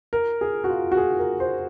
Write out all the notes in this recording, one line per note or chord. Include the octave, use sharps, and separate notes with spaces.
A#4
G#4
F#4
F4
F#4
G#4
A#4
C5